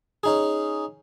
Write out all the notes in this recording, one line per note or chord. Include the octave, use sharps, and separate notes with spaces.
C#4 D#4 G#4